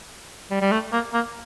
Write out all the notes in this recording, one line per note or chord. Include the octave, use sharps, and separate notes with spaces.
G3
G3
A3
A#3
A#3